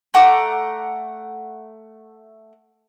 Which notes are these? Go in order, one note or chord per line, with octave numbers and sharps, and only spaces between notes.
A3 F#5 A#5 D6